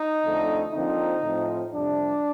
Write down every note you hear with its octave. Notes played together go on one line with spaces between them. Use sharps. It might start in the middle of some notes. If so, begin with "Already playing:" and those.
Already playing: D#4
F2 D3 A3 C4
D3 F3 A#3 C4 D#4
A2 F3 C4
F2 C3 G3 D4